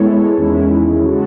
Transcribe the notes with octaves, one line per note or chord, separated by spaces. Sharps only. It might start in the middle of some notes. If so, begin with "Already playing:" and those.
Already playing: G#3 B3 E4 A4 C#5
E2 D#3 G#3 C#4 E4
C#3 G#3 C#4 F#4 A4